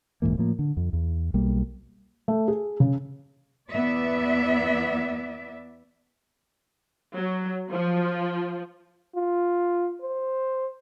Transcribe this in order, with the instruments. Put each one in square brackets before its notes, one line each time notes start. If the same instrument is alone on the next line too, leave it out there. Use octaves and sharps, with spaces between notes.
[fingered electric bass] D#1 G#2 E3 A#3
A2 F3 A#3
D3
F2
E2
B1 G3 A#3
[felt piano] A3
G#4
C#3
[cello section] E2 B3 D5 E5
[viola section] F#3
F3
[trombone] F4
C5